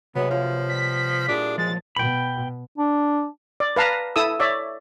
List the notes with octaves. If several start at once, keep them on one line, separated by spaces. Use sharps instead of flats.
C3 F#3 G#3 B3 B4 E5
F3 F4 A#4 C#5
G3 B6
A#2 D4 E4 G4 G#4
F3 F#3 G#3 A6
B2 G5 B5
D4
D5
B4 F5 A5 A#5
E4 A4 D#6 E6
C#5 D5 E5